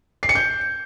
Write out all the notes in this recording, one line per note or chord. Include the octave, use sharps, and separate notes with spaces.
C7
C#7
G6